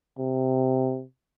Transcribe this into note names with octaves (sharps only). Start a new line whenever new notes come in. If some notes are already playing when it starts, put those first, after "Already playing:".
C3